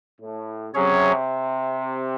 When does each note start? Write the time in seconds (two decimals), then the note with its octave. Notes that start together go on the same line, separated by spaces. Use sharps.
0.20 A2
0.74 C3 F#3 C#4 G#4 C#5